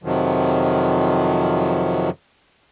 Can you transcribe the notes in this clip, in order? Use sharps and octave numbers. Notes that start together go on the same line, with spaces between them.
F2 C3 D#3 F3 F#3